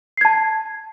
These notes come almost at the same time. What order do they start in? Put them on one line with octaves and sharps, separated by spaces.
C7 G#6 A5